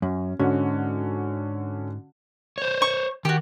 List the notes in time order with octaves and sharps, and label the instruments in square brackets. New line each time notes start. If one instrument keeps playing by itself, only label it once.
[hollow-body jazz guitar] F#2 [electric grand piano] C#4
[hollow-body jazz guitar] G#2 [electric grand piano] D3 C#4 F#4
[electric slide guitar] C5 C#5
[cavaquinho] C#6
[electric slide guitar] D#3 [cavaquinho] F#4 G4